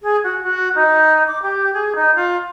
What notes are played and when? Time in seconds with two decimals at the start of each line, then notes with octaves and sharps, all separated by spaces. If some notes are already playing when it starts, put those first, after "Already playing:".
0.01 G#4
0.24 F#4
0.43 F#4
0.75 D#4
1.26 D6
1.42 G4
1.73 G#4
1.95 D#4
2.15 F4